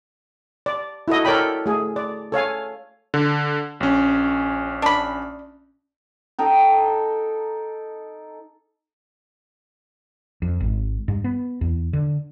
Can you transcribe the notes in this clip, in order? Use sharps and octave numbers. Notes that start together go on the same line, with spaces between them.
D5
E4 F#4 A4 D#5
A4 A#4 C#5 D5 G5 B5
A3 G#4
D5
A4 C#5 F5 G#5
D3
A#1 C#4
D4 B5
D#4 A4 G5 A#5
F2
G#1
G2
B3
E2
D3